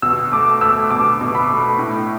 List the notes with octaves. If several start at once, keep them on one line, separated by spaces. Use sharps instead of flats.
B2 E6
A3 D6
A3 E6
B2 D6
B2
B5
A3
A2